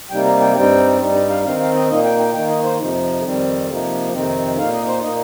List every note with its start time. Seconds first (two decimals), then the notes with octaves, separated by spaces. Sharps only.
0.11 C3 G3 A#3 D#4 G5
0.25 A#5
0.41 G5
0.56 G2 G3 C4 D#4 G5
1.00 G2 G3 D#4
1.15 A#5
1.30 F5
1.44 D#3 C4 D#4 F5
1.60 F5
1.75 D#5
1.89 A#2 A#3 D#4 D#5
2.04 G5
2.20 G5
2.34 D#3 A#3 D#4 G5
2.49 D#5
2.64 C5
2.79 F2 C3 F3 D#4
3.24 F2 D#3 G3 C4
3.68 C3 F3 A#3 D#4
4.13 F2 C3 D#3 C4 D#4
4.57 A#2 A#3 D#4 F5
4.72 D#5
4.88 C5
5.03 A#2 A#3 D#4 D#5